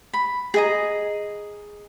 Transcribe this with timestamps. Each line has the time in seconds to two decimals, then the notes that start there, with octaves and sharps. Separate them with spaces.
0.13 B5
0.54 G#4 D#5 A#5